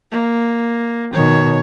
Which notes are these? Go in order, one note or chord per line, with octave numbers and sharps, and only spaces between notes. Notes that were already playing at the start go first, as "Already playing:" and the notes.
A#3
B2 D#3 C#5